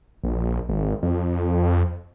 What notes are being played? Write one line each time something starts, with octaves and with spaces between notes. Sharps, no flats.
A#1
G#1
F2